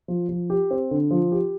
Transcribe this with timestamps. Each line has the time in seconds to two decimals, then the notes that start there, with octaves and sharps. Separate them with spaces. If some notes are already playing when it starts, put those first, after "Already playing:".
0.08 F3
0.29 F3
0.50 G4
0.71 C4
0.91 D3
1.11 F3
1.32 G4